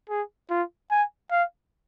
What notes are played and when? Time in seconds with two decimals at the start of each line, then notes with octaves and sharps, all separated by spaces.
0.10 G#4
0.50 F4
0.91 G#5
1.31 F5